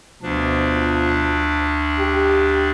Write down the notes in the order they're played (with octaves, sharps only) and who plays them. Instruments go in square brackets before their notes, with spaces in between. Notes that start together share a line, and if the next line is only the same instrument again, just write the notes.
[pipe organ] D2 D4 [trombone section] B2 F3
[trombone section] G4